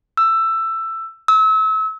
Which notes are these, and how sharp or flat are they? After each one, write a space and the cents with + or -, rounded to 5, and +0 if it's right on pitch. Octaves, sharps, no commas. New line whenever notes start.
E6 +10
E6 -35